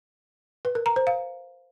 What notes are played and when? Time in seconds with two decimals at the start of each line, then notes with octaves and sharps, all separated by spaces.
0.65 B4
0.75 A#4
0.86 A#5
0.96 C5
1.07 F5